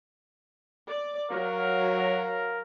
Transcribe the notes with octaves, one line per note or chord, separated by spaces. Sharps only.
D5
F#3 A#4 F5